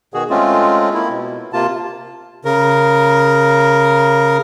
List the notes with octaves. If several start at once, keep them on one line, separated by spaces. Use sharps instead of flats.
B2 D#3 F#4 G#4
G#3 A3 C4 C#4 F4
A#3 E4
B2
C3 A#3 F4 A5
C#3 A#4